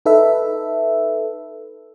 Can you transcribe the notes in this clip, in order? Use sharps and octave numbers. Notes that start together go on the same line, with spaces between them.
D#4 A4 B4 E5